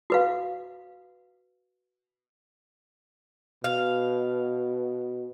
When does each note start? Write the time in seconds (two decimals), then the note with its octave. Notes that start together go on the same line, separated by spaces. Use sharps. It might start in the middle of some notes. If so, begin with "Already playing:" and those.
0.10 F#4 B4 F5
3.64 B2 F5